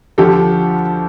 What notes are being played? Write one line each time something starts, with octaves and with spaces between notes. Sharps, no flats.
D2 D3 F3 G4 A4